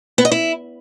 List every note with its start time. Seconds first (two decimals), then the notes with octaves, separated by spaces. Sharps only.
0.18 B3
0.25 D#5
0.32 E4